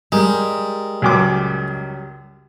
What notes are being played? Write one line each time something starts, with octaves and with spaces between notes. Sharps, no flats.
G3 G#3 A#4
C#2 F#2 D6